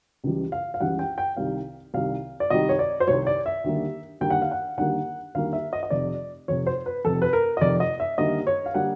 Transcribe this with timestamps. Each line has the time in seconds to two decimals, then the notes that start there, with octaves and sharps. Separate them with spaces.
0.24 C#2 C#3 E3 G3
0.52 F5
0.74 F5
0.80 C#2 C#3 E3 G3 F#5
0.99 G5
1.18 G5
1.37 C2 C3 D#3 G3 F5
1.94 C2 C3 D#3 G3 F5
2.40 D5
2.50 C2 C3 D#3 G3 D#5
2.69 C#5
2.79 D5
3.00 C5
3.07 C2 C3 D#3 G3 C#5
3.27 D5
3.46 E5
3.64 D#2 D3 G3 A#3
4.21 D#2 D3 G3 A#3 G5
4.30 F#5
4.42 F5
4.51 F#5
4.77 D#2 D3 G3 A#3 F#5
5.35 D#2 D3 G3 A#3 F5
5.53 E5
5.73 D#5
5.83 D#5
5.90 F1 F2 C3 D5
6.48 F1 F2 C3 C#5
6.67 C5
6.86 B4
7.04 F1 F2 C3 A4
7.22 B4
7.33 A#4
7.57 D#5
7.61 F1 F2 C3 D5
7.80 D#5
8.00 E5
8.18 D#2 D3 G3 A#3 D#5
8.47 C#5
8.66 F5
8.74 D3 G3 A#3 F#5